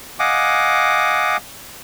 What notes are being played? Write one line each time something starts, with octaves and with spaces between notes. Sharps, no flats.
D#5 F5 F#5 G#5 D6